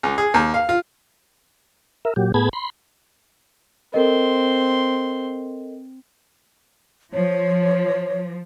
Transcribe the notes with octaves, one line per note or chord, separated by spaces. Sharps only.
C#2
G#4
D#2
F5
F4
A#4 E5
A#2 F#3 G4
A2 B3 G#4 A5 B5 G#6
B5 C6
C4 A4 A#4 D#5 C6
F3 C#5